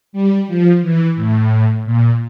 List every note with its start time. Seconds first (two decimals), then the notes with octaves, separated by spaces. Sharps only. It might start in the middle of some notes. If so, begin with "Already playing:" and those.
0.13 G3
0.48 F3
0.82 E3
1.16 A2
1.85 A#2